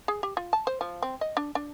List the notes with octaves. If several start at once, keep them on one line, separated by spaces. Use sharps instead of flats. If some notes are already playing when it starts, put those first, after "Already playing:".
G#4
G4
F4
A5
C5
F3
C4
D#5
D4
D4